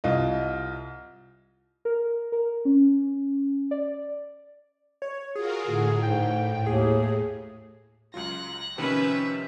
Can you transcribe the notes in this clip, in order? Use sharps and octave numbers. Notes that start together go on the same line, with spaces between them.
C2 F4 D#5
A#4
A#4
C#4
D5
C#5
F4 F#4 G#4 A#4
A2 D3
G#2 G5
D#2 G#4
C#2 F#3 F4 F#6 A#6
C3 D#3 F3 C#4 B4 C5 E5